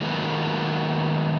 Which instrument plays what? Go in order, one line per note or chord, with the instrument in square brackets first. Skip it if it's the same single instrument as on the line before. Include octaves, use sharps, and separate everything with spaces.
[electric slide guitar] D#3 F#3 G#3 A#3 B3